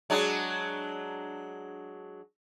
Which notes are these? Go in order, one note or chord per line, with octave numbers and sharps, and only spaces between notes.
F#3 G#3 D4